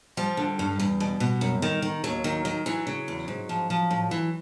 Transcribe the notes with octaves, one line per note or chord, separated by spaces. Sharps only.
F3 G3
D3
G2
E2
B2
B2
F#2
D#3
D#3
D#2 F#3
D#3
D#3
E3 F#3
C#3
E2
G#2
F3
F3
A2
E3